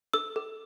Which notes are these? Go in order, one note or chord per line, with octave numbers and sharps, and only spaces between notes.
A4 E6
A4